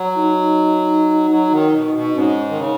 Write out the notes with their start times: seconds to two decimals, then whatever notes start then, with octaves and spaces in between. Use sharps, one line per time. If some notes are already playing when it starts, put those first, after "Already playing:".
Already playing: F#3
0.17 D#4
1.30 F#3
1.52 D#3
1.74 B2
1.95 B2
2.15 G#2 C#4
2.50 D#3
2.59 C#3